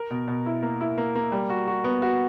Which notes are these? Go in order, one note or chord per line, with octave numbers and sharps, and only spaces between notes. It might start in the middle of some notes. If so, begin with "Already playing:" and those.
Already playing: A#4
B2
B2
E4
A#3
E4
A#3
A#3
G3
F#4
F#4
B3
F#4